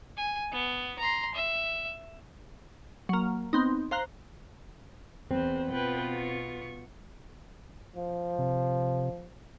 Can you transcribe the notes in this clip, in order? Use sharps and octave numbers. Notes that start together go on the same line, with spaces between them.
G#5
B3
A#5 C6
E5
F#3 A#3
B3 C4 D#4
C5 F5 A#5 F#6
E2 C4 B4 C5
B2 B3 F4 B4 G5
C#6
F3
C3